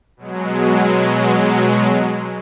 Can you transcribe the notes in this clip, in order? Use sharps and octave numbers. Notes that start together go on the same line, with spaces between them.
B2 F#3 G#3